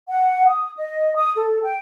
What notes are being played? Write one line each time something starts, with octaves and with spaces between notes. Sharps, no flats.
F#5
D#6
D#5
D#6
A4
G5